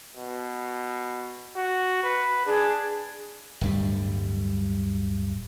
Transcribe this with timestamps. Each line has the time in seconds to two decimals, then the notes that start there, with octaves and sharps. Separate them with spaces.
0.17 B2
1.56 F#4
2.03 B4
2.46 D4 G#4
3.61 D1 G2 G3